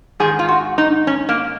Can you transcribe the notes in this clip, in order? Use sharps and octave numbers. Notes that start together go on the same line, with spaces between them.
G#2 D#3 G#4
F4
F#4
D#4
C#4
A#3